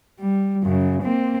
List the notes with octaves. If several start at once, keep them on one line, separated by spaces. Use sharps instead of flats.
G3
F#2 C#3
A#3 C4